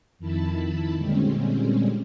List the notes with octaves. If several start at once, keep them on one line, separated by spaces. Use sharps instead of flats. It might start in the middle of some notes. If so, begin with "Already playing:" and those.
F2 D#3 E4 A5 B5
A#2 D3 G3 G#3 C4 C#4